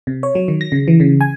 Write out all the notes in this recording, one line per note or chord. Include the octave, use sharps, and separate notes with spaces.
C3
C#5
F#3
D#3
A#6
C#3
E3
C#3
G#5